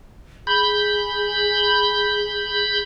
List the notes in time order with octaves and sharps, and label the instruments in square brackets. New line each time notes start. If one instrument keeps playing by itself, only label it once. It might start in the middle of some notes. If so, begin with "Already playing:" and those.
[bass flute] G#4 [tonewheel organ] B5 G6